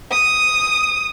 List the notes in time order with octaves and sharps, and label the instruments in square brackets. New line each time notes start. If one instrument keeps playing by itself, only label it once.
[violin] D#6